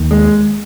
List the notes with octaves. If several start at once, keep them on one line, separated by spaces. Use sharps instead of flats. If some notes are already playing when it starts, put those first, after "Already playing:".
Already playing: D#2 D#3 A#3
G#3